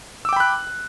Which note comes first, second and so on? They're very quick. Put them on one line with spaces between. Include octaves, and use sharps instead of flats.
E6 D6 G5 B5 F#6